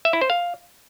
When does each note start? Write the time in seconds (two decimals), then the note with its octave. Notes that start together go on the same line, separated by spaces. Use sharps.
0.05 E5
0.13 E4
0.21 C5
0.30 F5